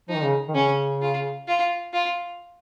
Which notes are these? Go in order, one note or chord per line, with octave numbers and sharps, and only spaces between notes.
F3 D#4
D#3
C#3
D#3
C#3 C#4
F4
F4
F4